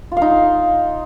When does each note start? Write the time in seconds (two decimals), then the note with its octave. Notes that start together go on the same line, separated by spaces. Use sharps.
0.12 F4
0.17 F5
0.22 D#4